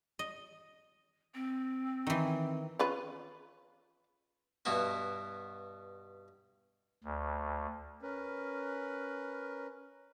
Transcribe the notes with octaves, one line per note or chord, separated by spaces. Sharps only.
D#5
C4
D#3 E3
C#4 F4 B4
G2 B2 B3 E4 F#4
D2
C#4 A#4 B4